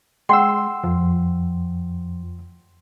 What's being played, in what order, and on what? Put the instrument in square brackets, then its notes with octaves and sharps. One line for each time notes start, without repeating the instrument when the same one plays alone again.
[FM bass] G#3 [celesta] F#5 G5 [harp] C6 E6
[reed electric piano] F2 [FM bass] F3